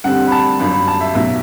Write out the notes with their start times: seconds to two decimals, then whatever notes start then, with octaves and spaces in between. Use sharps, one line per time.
0.04 G2 D3 G3 C4 F#5
0.27 B5
0.32 A5
0.59 G1 F#2 F#3 B5
0.73 B5
0.88 A5
1.01 E5
1.15 B1 B2 F#3 E5